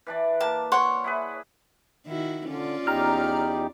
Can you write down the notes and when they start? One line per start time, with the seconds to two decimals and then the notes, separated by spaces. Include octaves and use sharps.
0.07 E3 D4 D5
0.41 A#3 A5
0.72 C#5 F#5 C6
1.04 E4 G#4 B4
2.07 D#3 E4 F#4
2.48 D3 C#4 F4 D5
2.87 E2 D#4 G4 A#5 F6